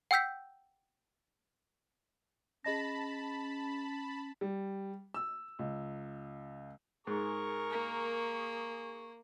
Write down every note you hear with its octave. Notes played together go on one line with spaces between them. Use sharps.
F#5 G5 E6 G6 B6
C#4 G#4 D#5 A5 B5 A#6
G3
E6
C#2
G#2 G#4 A#4 C#6
A#3